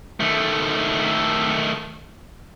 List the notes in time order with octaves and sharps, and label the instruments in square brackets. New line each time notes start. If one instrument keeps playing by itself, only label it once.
[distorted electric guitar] D#3 A3